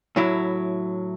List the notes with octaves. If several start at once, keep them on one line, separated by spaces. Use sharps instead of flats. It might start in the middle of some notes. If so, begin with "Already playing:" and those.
A2 F#3 E4